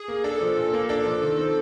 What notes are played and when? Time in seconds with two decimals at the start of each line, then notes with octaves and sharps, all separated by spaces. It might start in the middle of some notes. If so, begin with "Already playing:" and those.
Already playing: G#4
0.08 A#3
0.24 D4 A4
0.41 F3
0.57 A#2
0.74 A#3
0.89 D4 A4
1.06 F3
1.22 D#3
1.38 C4